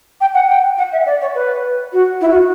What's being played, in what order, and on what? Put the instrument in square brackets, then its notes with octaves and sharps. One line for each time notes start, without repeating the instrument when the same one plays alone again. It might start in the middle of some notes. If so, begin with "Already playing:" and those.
[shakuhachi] G5
F#5
G5
F#5
E5
D5
C#5
B4
F#4
E4
F#4